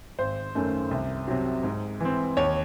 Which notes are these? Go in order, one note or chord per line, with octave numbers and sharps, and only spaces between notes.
G#1 C5
F#2 D#3 A3 C#4
C2
C3 F#3
G#2
E3 C4
D#2 C#5